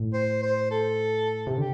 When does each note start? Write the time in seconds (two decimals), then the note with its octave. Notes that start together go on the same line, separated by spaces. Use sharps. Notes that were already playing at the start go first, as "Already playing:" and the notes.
Already playing: A2
0.13 C5
0.43 C5
0.71 A4
1.47 C3
1.58 D3 G4